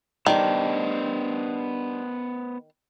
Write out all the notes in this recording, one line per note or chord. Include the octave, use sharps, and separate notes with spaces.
D#3 G3 B3 D4 C5 D5 A5